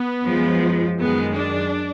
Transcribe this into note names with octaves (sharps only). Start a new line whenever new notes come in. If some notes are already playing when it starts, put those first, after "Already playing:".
Already playing: B3
F#2 F3 G#3
F#2 D#3 G#3 B3
D4